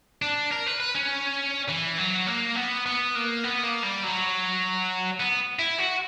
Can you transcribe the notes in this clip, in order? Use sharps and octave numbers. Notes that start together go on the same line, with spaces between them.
D4
A#4
B4
B4
C#4
E3
F#3
A#3
B3
B3
A#3
B3
A#3
G3
F#3
B3
E4
F#4